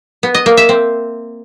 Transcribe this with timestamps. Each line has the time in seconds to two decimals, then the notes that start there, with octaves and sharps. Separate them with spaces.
0.23 B3
0.35 D#5
0.46 A#3
0.57 E5
0.69 C4